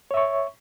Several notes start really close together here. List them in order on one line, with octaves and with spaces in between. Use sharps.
C#5 E5 C#6